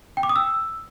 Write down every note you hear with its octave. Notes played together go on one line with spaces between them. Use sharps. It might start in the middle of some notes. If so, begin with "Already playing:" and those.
G5
D6
D#6
E6